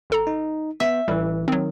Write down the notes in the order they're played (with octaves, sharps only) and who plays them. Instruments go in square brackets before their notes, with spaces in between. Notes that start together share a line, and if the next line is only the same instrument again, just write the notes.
[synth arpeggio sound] G#1 A4 A#5
[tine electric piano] D#4
[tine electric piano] B3 [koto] E5
[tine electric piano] A1 E3 [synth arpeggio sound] A2 G3
[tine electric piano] D#3 [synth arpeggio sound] F#3 C4